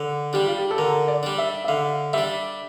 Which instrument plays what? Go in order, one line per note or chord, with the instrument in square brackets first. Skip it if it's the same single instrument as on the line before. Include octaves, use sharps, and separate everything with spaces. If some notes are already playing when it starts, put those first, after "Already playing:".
Already playing: [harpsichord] D3
[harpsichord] G3 D4 [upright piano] G4
[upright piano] F4
G4
A4
[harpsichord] D3 [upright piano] A#4
[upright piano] D5
[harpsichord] G3 D4
[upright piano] E5
E5
[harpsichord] D3 [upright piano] F5
[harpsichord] G3 D4 [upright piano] E5